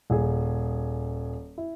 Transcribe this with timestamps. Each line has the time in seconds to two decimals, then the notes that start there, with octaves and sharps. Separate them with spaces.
0.10 D#1 G#4
1.58 E4